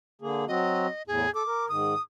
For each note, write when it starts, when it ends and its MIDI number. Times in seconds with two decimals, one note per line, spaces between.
0.22 0.45 50
0.22 0.45 58
0.22 0.45 68
0.48 0.87 54
0.48 0.87 60
0.48 0.87 66
0.48 1.03 75
1.07 1.26 40
1.07 1.26 45
1.07 1.33 68
1.35 1.43 69
1.35 1.66 86
1.47 1.68 70
1.69 1.94 44
1.69 1.94 51
1.69 2.01 87